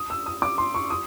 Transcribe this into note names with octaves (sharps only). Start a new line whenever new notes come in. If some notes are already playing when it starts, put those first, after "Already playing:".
Already playing: D#6
E6
D#6
D6
C6
C#6
D#6